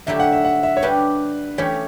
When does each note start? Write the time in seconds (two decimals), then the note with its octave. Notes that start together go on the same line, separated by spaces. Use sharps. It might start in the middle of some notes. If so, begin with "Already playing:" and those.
0.07 D3 F#3 A3 E4 G4 E5
0.20 F#5
0.32 E5
0.45 F#5
0.63 E5
0.77 C#5
0.82 G3 D4 G4 B4
1.58 E3 A3 C#4 E4 G4 C#5